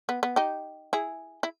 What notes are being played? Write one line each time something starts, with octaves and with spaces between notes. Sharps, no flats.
B3
B3
D#4 G4
E4 G#4
E4